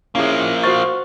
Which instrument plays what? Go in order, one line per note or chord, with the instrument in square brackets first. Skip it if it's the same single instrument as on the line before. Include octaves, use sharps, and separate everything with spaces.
[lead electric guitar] F3 A#3 [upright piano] C#4 E4 G#4
[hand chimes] F#4 C5 C#6 [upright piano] F5 F6 A6